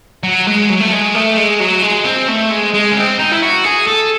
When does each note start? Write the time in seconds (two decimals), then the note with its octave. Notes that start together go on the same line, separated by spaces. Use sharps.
0.23 F#3
0.47 G#3
0.70 F#3
0.80 A3
0.92 G#3
1.15 A3
1.37 G#3
1.60 F#3
1.83 G#3
2.05 C4
2.28 A3
2.51 G#3
2.74 G#3
2.91 C#4
2.97 C4
3.19 D#4
3.32 E4
3.42 F#4
3.64 G#4
3.87 A4